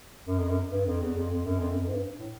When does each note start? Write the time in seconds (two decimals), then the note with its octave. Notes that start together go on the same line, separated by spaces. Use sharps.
0.27 F#2
0.38 F2
0.49 F#2
0.71 G2
0.86 F2
1.01 E2
1.16 F2
1.30 F2
1.45 F#2
1.59 F2
1.71 F#2
1.81 F2
1.88 G#2
1.92 G2
2.19 A2